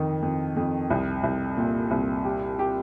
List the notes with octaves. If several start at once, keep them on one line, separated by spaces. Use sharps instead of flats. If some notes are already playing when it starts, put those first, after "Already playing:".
Already playing: F2 D#3
F2
F2
C2
C2
A#2
C2
G4
G4